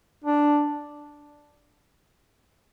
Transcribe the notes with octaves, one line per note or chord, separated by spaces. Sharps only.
D4